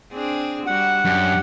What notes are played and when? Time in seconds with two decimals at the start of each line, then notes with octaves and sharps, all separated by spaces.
0.13 C4 D4 G#4
0.67 G3 F#4 F#5
1.05 F#2 D4 G4